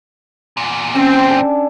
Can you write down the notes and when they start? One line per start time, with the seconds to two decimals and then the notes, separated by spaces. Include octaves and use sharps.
0.57 E2 A#2
0.95 C4 C#4 G5
1.29 D4 A4 G#5